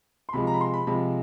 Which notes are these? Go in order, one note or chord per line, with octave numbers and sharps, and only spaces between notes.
C6
C3 F3 G#3 B5
A#5
B5
C6
B5
C3 F3 G#3 B5